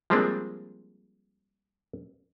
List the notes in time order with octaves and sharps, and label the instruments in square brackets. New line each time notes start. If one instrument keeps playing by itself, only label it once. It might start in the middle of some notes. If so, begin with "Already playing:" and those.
[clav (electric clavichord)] F3 G3 G#3 A#3 C4 D4